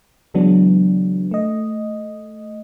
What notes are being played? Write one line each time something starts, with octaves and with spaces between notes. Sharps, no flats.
C#3 E3 F#3 G#3 B3 D4
A3 D#5